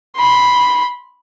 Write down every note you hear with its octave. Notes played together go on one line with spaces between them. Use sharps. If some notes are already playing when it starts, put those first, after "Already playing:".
B5 C6